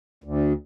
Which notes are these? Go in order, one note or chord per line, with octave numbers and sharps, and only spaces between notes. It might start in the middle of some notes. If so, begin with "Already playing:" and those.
D2